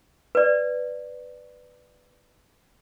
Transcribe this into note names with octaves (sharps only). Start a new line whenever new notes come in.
B4 D5